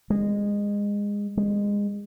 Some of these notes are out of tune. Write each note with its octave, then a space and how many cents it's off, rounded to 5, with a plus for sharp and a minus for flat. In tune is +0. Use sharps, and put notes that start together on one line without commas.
G#3 -20
G#3 -25